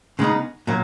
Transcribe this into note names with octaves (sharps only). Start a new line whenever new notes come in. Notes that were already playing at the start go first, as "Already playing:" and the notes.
C#3 G#3 B3 D#4
A#2 F#3